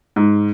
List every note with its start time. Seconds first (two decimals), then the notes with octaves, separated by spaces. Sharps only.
0.16 G#2